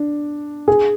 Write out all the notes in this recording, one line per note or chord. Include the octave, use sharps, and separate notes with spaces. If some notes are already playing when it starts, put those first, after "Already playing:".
Already playing: D4
G#4